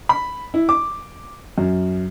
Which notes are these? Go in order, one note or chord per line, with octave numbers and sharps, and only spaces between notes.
B5
E4
D6
F#2